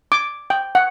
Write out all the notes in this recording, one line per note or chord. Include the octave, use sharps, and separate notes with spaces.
D6
G5
F#5